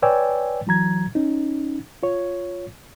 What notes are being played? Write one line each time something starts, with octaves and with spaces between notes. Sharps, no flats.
B4 C#5 D5 G5 G#5 E6
E3 F#3 A#5 G#6
C#4 D#4
F4 C#5